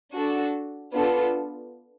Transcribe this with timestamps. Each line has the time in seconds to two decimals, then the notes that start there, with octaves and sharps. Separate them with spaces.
0.15 D4 F#4 A4
0.92 B3 D4 F4 A4